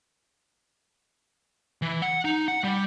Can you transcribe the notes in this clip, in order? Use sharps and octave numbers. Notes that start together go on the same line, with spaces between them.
E3
F#5
D#4
F#5
G3